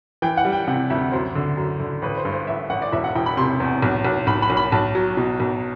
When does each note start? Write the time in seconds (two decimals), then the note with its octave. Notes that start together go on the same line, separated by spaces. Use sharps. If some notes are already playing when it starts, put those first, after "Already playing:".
0.22 E3 G5
0.37 F#5
0.45 G3
0.52 G5
0.67 C3 F#5
0.90 D2 E5
1.12 F#2 C5
1.35 D3
1.57 F#2
1.80 D3
2.02 A1 B4
2.17 C5
2.25 G2
2.32 C5
2.47 A1 E5
2.70 A1 F#5
2.82 D5
2.92 E1 E5
3.04 F#5
3.15 E1 G5
3.26 B5
3.37 C3 C6
3.60 E2
3.82 B1
4.05 B1
4.27 B1 B5
4.42 B5
4.50 B1
4.57 B5
4.72 B1 A5
4.95 F#3
5.17 B2
5.40 B1